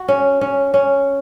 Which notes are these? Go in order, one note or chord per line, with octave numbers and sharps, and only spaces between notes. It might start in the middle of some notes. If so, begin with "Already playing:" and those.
Already playing: F#4
C#4
C#4
C#4